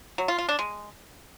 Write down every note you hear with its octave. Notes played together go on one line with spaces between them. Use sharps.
F#3
F4
F4
D4
G#3